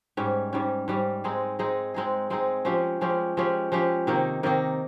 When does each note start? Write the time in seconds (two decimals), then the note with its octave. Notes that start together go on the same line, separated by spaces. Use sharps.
0.17 G#2 G3 C#4
0.53 G#2 G3 C#4
0.88 G#2 G3 C#4
1.24 G#3 C4 D#4 G#4
1.59 G#3 C4 D#4 G#4
1.94 G#3 C4 D#4 G#4
2.30 G#3 C4 D#4 G#4
2.65 F3 G#3 C#4 G4
3.01 F3 G#3 C#4 G4
3.37 F3 G#3 C#4 G4
3.72 F3 G#3 C#4 G4
4.07 C3 D#3 A#3 D#4
4.43 C3 D#3 A#3 D#4